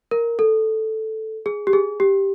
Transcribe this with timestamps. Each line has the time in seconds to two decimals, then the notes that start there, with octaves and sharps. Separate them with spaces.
0.11 A#4
0.39 A4
1.46 G#4
1.67 G4
1.73 G#4
2.00 G4